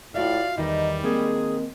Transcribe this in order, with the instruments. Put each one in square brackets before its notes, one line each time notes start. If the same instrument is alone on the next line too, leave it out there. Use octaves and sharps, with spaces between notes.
[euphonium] A2 [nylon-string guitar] F4 F#4 E5 [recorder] D5 [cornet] F5
[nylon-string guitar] E2 D#3 E5 [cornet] G3 [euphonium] D#4 [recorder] D#5
[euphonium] D#3 [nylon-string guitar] G#3 A#3 C4 [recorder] G#4